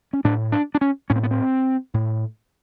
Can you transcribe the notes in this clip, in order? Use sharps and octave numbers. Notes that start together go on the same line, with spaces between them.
C#4
A2 D4
D4
D4
C#4
A2 C#4
C4
B3
C4
A2